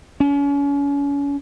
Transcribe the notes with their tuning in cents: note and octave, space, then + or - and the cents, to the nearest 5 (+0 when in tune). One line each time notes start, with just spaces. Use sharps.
C#4 +35